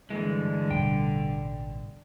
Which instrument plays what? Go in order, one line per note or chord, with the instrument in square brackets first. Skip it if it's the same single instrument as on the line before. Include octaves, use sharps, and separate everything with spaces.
[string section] G2 D3 [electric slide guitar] E3 G#3
[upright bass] A1 B2 [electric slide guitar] G5